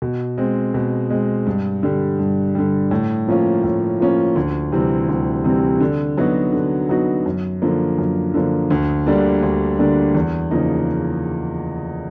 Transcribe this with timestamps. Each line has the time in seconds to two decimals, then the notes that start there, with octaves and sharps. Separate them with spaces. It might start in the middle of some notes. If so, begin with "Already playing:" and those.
0.02 B2
0.38 G#3 C4
0.74 B2
1.10 G#3 C4
1.46 G2
1.83 D3 G3
2.19 G2
2.55 D3 G3
2.91 A2
3.28 F3 A#3 C#4 F4
3.64 A2
4.00 F3 A#3 C#4 F4
4.36 D2
4.72 C3 E3 G3 C4
5.09 D2
5.44 C3 E3 G3 C4
5.80 D3
6.17 F#3 B3 D#4 F#4
6.53 D3
6.89 F#3 B3 D#4 F#4
7.26 F#2
7.62 D3 F3 A#3
7.98 F#2
8.34 D3 F3 A#3
8.70 D2
9.06 D3 G3 A#3 D4
9.43 D2
9.79 D3 G3 A#3 D4
10.14 E2
10.51 C#3 F3 A#3 D#4